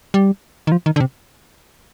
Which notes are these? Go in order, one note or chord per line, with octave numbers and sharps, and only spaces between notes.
G3
D#3
F3
D#3
D3
C3